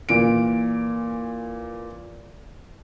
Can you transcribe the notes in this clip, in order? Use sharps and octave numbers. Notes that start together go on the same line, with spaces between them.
A#2 E3 D7